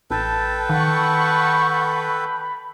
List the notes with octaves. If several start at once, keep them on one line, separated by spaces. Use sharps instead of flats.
A1 A4 B4 G5 A5
D#3 F#5 A5 B5 C#6